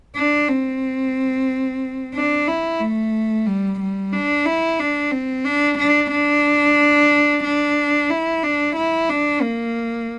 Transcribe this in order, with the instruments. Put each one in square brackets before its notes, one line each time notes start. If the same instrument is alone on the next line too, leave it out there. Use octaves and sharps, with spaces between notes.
[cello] D4
C4
D4
E4
A3
G3
G3
D4
E4
D4
C4
D4
D4
D4
D4
E4
D4
E4
D4
A#3